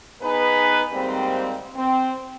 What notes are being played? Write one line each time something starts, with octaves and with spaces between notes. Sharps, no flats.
B3 D#4 G#4 B4
G#2 G3 A#3 C4
C4